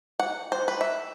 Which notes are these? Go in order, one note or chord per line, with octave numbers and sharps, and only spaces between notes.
F#5
C5
B4
E5